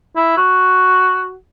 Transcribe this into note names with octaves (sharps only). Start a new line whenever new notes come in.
E4
F#4